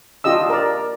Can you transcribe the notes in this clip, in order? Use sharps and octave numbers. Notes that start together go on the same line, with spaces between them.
D4 F4 G4 D#5 E6
A#4 D5